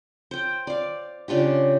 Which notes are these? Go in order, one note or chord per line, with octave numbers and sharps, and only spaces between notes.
C5 G5
D5 F5
C#3 D4 F4 G4